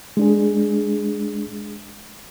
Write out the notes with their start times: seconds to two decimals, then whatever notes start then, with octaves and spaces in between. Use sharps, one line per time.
0.17 G#3 D4 G#4